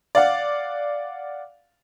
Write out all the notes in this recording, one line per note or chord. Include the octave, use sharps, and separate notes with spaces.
D5 F5 F#5